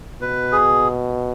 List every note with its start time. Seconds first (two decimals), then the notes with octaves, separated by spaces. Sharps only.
0.21 B2 B4
0.52 G#4